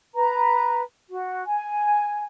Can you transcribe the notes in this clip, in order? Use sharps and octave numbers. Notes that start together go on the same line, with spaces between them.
B4 A#5
F#4
G#5